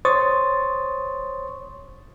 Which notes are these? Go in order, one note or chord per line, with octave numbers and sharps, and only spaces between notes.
C5 C#5 C6 C#6 D#6 A6